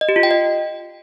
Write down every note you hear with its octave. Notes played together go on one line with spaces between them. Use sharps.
D#5
G4
F4
G5
D#5